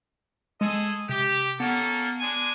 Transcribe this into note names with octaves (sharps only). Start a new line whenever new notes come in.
G#3 G#4 A4 D#5
C3 G4
A#3 B3 C#4 A4
G#3 D4 G#5